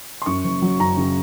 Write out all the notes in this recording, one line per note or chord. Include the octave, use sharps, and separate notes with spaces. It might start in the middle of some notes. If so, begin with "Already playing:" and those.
C6
F#2 C#6
F#1
F#3
F#2 A#5
C#3